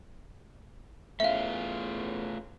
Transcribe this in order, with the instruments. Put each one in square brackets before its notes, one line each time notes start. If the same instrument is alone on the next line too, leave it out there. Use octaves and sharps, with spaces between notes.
[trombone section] E2 B3 C#4 [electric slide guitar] A3 F4 [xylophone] E5 F5